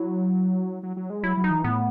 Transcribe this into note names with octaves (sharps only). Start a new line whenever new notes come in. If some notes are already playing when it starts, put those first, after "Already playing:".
Already playing: F#3 E4
F#3
F#3
G#3
F#3 E4
F#3
D#4
E3
A2 B3